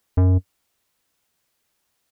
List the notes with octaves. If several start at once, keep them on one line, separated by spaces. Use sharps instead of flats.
F#2